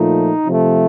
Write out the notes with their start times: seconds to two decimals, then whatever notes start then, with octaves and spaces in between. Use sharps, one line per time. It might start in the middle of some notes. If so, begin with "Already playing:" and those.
Already playing: A#2 F3 A3 D#4
0.45 C3 F3 A3